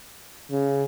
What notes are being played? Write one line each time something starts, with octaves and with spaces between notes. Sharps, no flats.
C#3